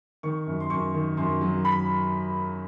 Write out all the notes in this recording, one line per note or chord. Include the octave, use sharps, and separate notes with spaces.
D#3 C#6
F#2
C6
F#2 C#6
D#3
F#2 C6
F#3
B5